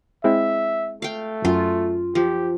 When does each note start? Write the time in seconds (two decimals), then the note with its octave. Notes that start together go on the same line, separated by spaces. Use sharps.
0.24 G#3 C4 E4 E5
1.02 A3 F5 G5
1.45 F#2 F4
2.15 F3 G4